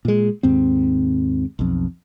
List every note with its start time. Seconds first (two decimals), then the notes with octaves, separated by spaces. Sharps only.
0.05 A#2 G#3
0.43 D#2 G#2 C4
1.59 B1 F2